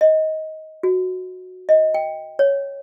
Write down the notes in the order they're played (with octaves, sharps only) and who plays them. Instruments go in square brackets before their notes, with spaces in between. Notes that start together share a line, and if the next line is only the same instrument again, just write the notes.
[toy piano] D#5
F#4
D#5
G5
C#5